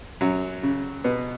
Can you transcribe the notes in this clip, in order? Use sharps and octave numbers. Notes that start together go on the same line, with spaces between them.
F#2 F#3
C#3
B2 B3